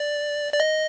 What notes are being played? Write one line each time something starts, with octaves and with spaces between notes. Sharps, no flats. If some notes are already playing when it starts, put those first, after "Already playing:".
Already playing: D5
D5
D#5